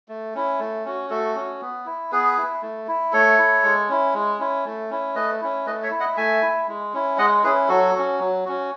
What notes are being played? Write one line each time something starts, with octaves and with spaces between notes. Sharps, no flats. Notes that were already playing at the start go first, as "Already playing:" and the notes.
A3
C#4 E4
A3
C#4 F#4
A3 F#4 A4
C#4 F#4
B3
E4
B3 G#4 B4
E4
A3
E4
A3 A4 C#5
E4
G#3
C#4 E4
G#3
C#4 E4
A3
C#4 E4
A3 B4 D#5
C#4 E4
A3 B4 D#5
C#5 E5
E4
D#5 F#5
A3 E5 G#5
E4
G#3
C#4 E4
G#3 D#5 F#5
C#4 E4 G#4 B4
F#3 F#4 A4
C#4 F#4
F#3
C#4 F#4